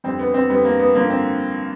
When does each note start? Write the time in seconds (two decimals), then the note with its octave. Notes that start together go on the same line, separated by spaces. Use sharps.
0.04 F2 D3 G3 C4
0.19 B3
0.34 C4
0.50 F2 D3 G3 B3
0.65 A#3
0.79 B3
0.95 G2 D3 F3 A#3
1.10 C4